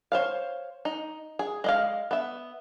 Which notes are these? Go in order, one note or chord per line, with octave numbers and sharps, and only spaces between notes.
C5 C#5 F5
D#4
G#4
G#3 D#5 F5
B3 E5